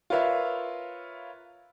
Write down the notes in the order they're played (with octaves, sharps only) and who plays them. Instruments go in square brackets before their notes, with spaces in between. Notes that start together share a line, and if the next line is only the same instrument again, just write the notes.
[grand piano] F4 A#4 B4 C#5 E5 F5